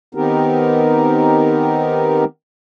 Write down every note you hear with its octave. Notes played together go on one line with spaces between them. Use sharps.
D#3 B3 C4 D#4 G4 A#4